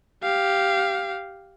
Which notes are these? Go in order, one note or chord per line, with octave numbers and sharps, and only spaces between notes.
G4 F5